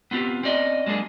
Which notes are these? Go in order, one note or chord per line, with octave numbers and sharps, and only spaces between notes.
B3 C4 F4 G4
C4 C#4 D5 D#5
F#3 G#3 A#3 D4 G#4